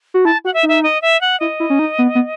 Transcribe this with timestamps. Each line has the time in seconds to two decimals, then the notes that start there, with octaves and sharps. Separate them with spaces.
0.14 F#4
0.25 E4 A5
0.45 F#4 F#5
0.54 E5
0.63 D#4
0.68 E5
0.83 D#5
1.02 E5
1.21 F#5
1.40 E4 D#5
1.60 E4
1.70 C#4
1.79 D#4
1.99 B3
2.15 B3